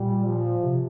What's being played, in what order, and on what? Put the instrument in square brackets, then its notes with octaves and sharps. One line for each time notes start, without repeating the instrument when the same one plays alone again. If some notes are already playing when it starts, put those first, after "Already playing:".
Already playing: [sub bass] A#2 [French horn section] G3
[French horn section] F3
[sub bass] C3